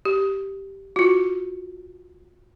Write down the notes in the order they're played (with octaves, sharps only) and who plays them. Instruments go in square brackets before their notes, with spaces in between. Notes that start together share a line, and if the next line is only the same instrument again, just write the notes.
[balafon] G4
F4 F#4